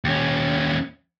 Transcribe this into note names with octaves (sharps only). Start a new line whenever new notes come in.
D#2 C#4